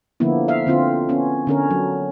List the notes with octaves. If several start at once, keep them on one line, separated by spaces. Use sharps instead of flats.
D3 F3 A#3 B3 E4
E5 F5
D3 C4 F4
B3 C#4
D3 C#4 A#4
F#3